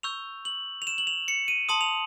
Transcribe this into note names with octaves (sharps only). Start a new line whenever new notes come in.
C#6 E6 G6 F7
F#7
F7
E7
F#7
F7
C#7
D#7
A5 C6 D#6 F#7
F7